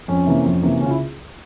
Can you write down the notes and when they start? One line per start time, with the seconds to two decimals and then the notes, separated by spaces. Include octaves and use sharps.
0.08 F2 C#4
0.26 C3 E3 A#3
0.45 F2
0.62 C3 E3 A#3
0.80 C#2 C#4 F4
0.91 E4